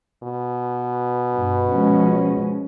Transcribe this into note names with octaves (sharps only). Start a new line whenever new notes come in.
B2
G2
F3 G#3 C#4